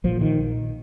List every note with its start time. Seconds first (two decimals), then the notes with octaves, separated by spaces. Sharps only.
0.04 A#1 A#2 F3
0.21 D#3